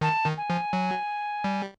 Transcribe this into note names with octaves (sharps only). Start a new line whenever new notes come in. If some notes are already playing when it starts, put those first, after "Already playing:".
D#3 A5
D#3
G#5
F3
F#3
G3